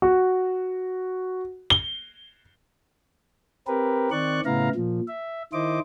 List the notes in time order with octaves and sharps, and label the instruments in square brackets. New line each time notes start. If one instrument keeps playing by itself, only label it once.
[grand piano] F#4
G7
[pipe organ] C4 G4 A#4 B4
D#3 C4 D5 C#6 F#6
A2 C#3 B3 E4 F5 A#5
A#2 F3
E5
D#3 E4 C5 D#5 D6